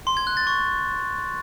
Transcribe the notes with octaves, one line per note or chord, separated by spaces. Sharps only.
C6
G#6
F#6
A6
C#6